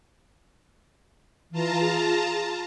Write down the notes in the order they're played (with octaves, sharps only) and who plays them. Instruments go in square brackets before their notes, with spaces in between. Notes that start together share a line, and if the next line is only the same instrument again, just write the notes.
[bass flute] E3 [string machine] F4 A5 A#5
[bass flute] G#4